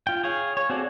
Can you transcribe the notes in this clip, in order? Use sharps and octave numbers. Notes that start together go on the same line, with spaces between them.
F4 G5
G#4 C#5 F5
C#5
C4 F#4 G#4 A4 D5